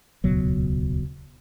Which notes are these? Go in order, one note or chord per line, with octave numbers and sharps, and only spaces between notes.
D#1 C#2 B2 F#3